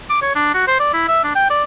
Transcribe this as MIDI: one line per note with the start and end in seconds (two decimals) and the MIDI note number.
0.10 0.21 86
0.22 0.34 73
0.35 0.52 62
0.54 0.63 66
0.68 0.75 72
0.80 0.93 74
0.94 1.06 64
1.08 1.23 76
1.24 1.34 62
1.35 1.48 79
1.50 1.63 74